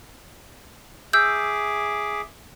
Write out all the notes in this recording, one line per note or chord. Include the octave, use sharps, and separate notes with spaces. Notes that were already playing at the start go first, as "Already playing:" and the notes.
G#4 E5 D6 E6 G6